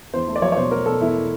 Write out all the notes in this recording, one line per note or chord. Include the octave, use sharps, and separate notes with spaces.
E2 C5
A3
D5
F#3 C#5
C#5
B2 C5
A3 A#4
B2 A4
E2 E4